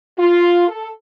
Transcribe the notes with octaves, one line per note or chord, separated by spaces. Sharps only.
F4
A4